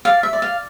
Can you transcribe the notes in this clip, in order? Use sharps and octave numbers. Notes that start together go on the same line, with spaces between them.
D5 F5
E5
D5
F5